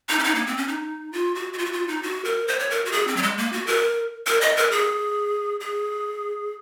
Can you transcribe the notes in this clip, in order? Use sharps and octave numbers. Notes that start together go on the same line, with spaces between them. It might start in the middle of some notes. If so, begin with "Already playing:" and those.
D#4
C#4
D#4
A#3
C4
C#4
D#4
F4
F#4
F#4
F4
F#4
F4
D#4
F#4
A#4
C5
C#5
A#4
F#4
G#4
C4
F#3
G#3
A#3
F#4
A#4
A#4
D#5
A#4
G#4
G#4